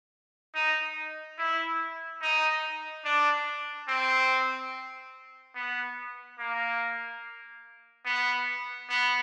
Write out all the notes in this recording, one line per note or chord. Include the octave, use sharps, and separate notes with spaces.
D#4
E4
D#4
D4
C4
B3
A#3
B3
B3